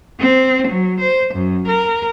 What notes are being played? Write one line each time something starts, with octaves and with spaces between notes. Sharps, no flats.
C4
F#3
C5
F#2
A#4